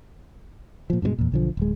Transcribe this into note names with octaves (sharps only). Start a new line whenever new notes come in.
A#2 F3
G2 B2 E3 G#3
E2 A#2
B1 D3 F3
D1 G#3